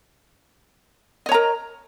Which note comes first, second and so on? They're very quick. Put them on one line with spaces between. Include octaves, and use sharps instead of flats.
D#5 C#5 A#5 A#4